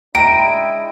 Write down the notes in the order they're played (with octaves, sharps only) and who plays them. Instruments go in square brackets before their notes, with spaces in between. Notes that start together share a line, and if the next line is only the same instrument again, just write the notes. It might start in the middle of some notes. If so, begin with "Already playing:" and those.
[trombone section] G#3 D4 E4 [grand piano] G5 [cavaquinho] A#5 [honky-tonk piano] D7 D#7